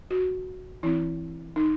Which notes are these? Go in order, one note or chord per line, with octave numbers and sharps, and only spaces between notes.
F#4
E3 C4 E4
D#4